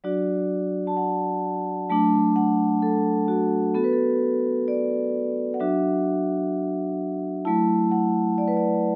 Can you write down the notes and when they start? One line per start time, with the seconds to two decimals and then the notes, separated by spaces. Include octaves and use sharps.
0.04 F#3 D4 F#4 D5
0.87 A5
0.97 F#5
1.89 F#3 A3 D4 A5
2.36 F#5
2.82 A4
3.28 F#4
3.75 B3 F#4 A4
3.84 B4
3.93 A4
4.68 D5
5.54 F#5
5.60 F#3 D4 F#4 E5
7.45 F#3 A3 E4 A5
7.91 F#5
8.38 D5
8.48 B4
8.57 D5